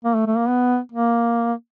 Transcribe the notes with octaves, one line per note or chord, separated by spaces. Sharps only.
A#3
A3
A3
A#3
B3
A#3